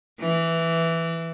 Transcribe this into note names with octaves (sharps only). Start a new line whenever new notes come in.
E3